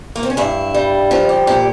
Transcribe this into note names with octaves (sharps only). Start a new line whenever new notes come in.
A#3
C4
C#4
G2 E4
G3
F3 F4
G4
A#2 G4